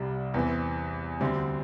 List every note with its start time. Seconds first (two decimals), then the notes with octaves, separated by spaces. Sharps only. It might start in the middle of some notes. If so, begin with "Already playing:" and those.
Already playing: C2 C3 G3
0.34 E2 E3 C4
1.21 D2 D3 G3 C4